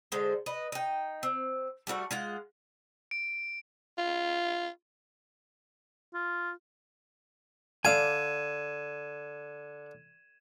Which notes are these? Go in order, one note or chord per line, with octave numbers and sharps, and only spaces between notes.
D3 G#3 C5
B4 D#5
D#4 G5
C4
G3 A3 F4 F#4
G#3 F4 F#5
D7
F4
F4
D3 D5 F5 G#5 G#6 D#7 E7